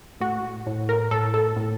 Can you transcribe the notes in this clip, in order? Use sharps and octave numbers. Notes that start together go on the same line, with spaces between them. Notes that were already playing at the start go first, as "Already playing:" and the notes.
A2 F#4
A2
A#4
A2 A4
A4
A2